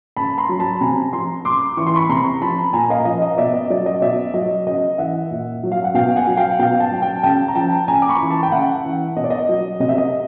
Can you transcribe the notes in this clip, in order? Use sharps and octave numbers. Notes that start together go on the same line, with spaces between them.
C#3 A5 B5
A#5 C6
F#3
A5 B5
C3 G#5 A#5
F3 A#5 C6
C#3 C6 D6
E3 C#6
C6
B5 C#6
C3 A#5 C6
F3 A5 B5
A#2 G#5 A#5
D#5 F5
F3 D#5
D#5
B2 D5 E5
D#5
F#3 D5
D#5
B2 D5 E5
F#3 D#5
C#3 D#5
E3 E5 F#5
A#2
F#3
F5
F#5
B2 F5 G5
F#5 G#5
F#3
F5 G5
B2 F5 G5
G5 A5
F#3
G5 A5
C#3 G5 A5
A#5
F3 G5 A5
C#3 G#5 A#5
D6
B5 C#6
E3
A5 B5
G5
C#3 E5 F#5
E3
B2 D#5
D5
D#5
F#3
C3 D#5
E5
D#5